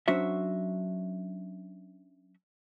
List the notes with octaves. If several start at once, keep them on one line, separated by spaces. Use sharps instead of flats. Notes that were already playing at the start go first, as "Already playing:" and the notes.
F#3 C#4 D4 F#4 C5 E5